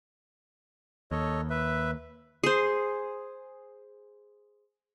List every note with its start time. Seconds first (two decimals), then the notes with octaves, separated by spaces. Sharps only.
1.11 D#2 A4 C#5 D#5
1.50 B4 E5
2.43 G#4 C5